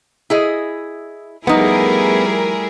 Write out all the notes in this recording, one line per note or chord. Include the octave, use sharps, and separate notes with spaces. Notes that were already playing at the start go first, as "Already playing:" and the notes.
E4 G#4 D#5
F3 G3 A3 B3 D#4 E4 G#4 A#4